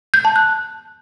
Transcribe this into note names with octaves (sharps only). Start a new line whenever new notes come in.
G6
A5
F#6